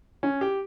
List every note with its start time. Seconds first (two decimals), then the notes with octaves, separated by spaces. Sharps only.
0.23 C#4
0.41 G4